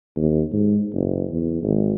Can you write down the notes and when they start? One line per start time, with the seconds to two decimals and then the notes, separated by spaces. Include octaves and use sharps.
0.17 D#2
0.53 G#2
0.93 F#1
1.31 E2
1.63 G#1